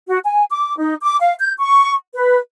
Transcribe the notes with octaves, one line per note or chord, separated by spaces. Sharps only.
F#4
G#5
D6
D#4
D6
F5
G6
C#6
B4